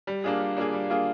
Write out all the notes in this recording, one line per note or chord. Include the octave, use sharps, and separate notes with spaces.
G3
A#3 D4 F4 G#4
G3
A#3 D4 F4 G#4
G3
A#3 D4 F4 G#4